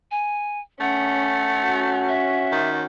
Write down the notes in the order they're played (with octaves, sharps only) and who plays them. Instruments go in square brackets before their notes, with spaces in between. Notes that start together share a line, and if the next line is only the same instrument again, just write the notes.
[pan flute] G#5
[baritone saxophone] A3 [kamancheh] C#4 [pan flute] F#5
[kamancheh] C#4 F#4
[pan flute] E5
[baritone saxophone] D#3